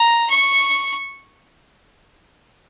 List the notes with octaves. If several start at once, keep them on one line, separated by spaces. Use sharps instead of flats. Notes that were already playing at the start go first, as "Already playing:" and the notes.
Already playing: A#5
C#6